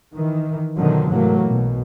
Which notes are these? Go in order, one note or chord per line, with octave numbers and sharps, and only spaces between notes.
D#3 E3
F#2 B2 D3 D#3 F3 F#3
G#2 C3 E3 F#3 A3 A#3
B1 B2